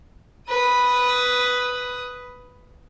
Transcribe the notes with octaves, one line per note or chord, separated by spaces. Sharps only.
B4 D#6